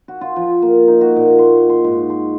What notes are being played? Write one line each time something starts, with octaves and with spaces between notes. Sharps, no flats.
F#4
F4
F3
A#3
D#4
F#4
A#2
C6
C6
G#2
C6